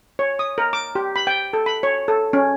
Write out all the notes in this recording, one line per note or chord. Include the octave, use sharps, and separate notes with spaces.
C#5
D#6
A#4
D6
G4
B5
G5
A4
B5
C#5
A4
C#4